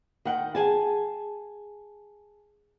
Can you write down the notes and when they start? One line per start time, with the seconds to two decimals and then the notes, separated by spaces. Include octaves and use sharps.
0.25 D#3 F#5 G5
0.55 G#4 G#5 A5